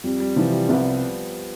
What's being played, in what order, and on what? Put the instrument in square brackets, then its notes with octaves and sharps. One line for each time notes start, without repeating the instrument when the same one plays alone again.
[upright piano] F2 [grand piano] G3
[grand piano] G3
[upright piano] C3 E3 [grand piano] F3
[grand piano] G3
[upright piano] C2 [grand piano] B3